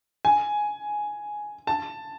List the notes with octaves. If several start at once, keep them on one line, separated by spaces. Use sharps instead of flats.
G#5
A5